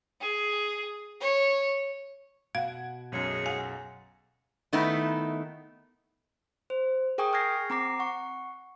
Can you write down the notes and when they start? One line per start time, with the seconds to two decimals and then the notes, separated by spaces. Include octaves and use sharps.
0.21 G#4
1.21 C#5
2.55 B2 F5 F#5 G#6
3.12 B1 F#2 G#3 G#4 C#5
3.46 F5 F#5 G#5
4.73 D#3 A3 B3 D#4 E4
6.70 C5
7.18 G#4 A#4 G5 G#5 C#6 D#6
7.33 C#6 F6 G6 G#6 A#6 C7
7.70 C4 A#5 D6 C7
7.99 F#5 C#6